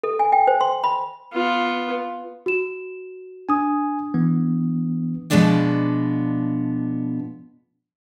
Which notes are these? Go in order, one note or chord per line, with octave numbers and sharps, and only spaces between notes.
A4
G#5
G5
C5
C6
B5
B3 F4
F#4 E7
D4 G#5 D#6
E3 B3
B2 F3 G#3 B3 D4 D5